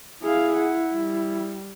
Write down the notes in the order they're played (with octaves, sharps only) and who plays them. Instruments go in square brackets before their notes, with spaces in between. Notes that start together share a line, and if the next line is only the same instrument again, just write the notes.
[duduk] E4 [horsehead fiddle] G#4 F5
[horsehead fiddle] F#5
G3